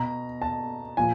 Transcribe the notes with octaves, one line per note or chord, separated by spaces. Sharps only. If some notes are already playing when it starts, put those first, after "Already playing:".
Already playing: B2 A#5
A5
A#2 F3 G#5